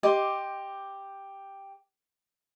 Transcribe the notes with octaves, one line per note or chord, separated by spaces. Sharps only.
G4 D#5 C6 D6